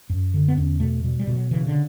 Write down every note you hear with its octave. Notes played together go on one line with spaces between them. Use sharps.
F#2
D3
B3
E2 C#4
B2 A3
B2 G3
G3
B2
F#3
C#3 E3
D3